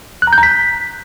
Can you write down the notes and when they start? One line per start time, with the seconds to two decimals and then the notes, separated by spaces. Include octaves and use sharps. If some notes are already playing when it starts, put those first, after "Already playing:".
0.22 F#6
0.27 A#5
0.33 G6
0.38 A#5
0.43 B6